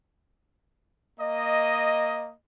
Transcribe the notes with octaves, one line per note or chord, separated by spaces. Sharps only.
A#3 D#5